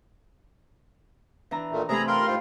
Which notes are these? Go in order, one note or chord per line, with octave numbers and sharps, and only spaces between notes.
E3 D4 A#5
A#2 D#3 A3
C3 A3 G#4 A#5 B5
F4 A#4 G5 B5 C6 F6
G#2 C4 F4 F5